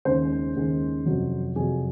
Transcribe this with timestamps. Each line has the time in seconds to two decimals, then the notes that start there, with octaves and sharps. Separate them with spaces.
0.05 D#2 C#3 G#3 C5
0.56 D#2 C#3 G#3
1.06 F2 C3 F#3
1.56 F2 C3 F#3 G#4